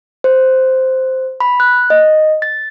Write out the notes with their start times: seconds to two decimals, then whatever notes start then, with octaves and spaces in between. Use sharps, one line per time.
0.24 C5
1.40 B5
1.60 F#6
1.90 D#5
2.42 A6